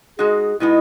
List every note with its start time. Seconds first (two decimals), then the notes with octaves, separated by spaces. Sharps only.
0.18 G#3 D#4 F#4 G#4
0.60 B2 G#3 B3 D#4 E4